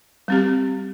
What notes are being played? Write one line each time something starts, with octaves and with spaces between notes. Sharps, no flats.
G3 C4 G4